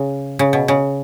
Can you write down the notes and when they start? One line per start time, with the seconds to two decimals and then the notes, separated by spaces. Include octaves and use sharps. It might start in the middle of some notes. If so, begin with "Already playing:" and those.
Already playing: C#3
0.39 C#3
0.53 B2
0.68 C#3